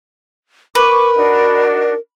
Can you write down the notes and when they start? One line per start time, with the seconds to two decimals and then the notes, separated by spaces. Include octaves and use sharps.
0.75 A#4 B4 C#6 D6
1.16 D4 D#4 F#4